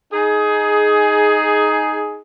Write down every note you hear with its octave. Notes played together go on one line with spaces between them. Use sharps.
D#4 G#4